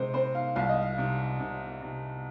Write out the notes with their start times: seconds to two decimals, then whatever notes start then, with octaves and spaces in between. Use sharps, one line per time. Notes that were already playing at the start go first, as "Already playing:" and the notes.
Already playing: C3 G#3 C5
0.14 C4 C5
0.35 F5
0.56 C2 F5
0.69 D#5
0.82 F5
0.98 C3
1.40 C3
1.82 C3